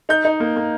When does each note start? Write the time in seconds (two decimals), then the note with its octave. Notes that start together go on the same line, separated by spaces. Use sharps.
0.09 D#4 G6
0.25 D#4
0.40 A#3
0.56 A#3